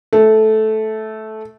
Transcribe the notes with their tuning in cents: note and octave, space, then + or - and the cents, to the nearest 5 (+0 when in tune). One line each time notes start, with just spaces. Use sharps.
A3 -10